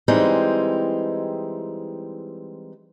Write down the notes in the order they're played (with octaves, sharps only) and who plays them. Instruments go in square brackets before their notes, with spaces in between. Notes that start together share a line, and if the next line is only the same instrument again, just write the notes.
[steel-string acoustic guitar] E3 G3 G#3 C4 D#4